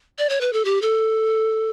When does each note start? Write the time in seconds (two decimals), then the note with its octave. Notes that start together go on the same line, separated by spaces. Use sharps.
0.18 D5
0.29 C#5
0.41 B4
0.53 A4
0.65 G4
0.82 A4